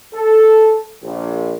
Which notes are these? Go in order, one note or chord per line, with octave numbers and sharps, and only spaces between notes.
A4
A#1